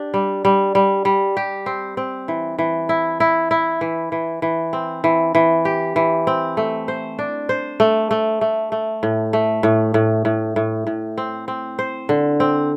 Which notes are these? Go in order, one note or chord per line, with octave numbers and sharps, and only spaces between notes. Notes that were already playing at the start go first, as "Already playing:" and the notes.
Already playing: D4 G4
G3
G3
G3
G3
G4
C4
C4
E3
E3
E4
E4
E4
E3
E3
E3
C4
E3
E3
G4
E3
C4
A3
C5
D4
C5
A3
A3
A3
A3
A2
A3
A2
A2
A2
A2
A2
C4
C4
C5
D3
C4